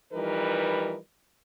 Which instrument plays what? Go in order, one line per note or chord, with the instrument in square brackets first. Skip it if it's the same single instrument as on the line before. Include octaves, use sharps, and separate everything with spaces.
[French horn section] E3 F3 G3 D#4 A#4 B4